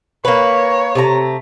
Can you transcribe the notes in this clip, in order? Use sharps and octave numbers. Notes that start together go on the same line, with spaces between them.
A#3 B4 C#5
C3 A3 A#5